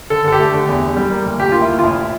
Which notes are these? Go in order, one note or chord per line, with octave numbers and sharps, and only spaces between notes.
D3 A4
D3 A4
G4
A3
D3
E2
E2
G3
A#3
D2
A#3 G4
A#3 F4
E4
D2
F4
A1 E4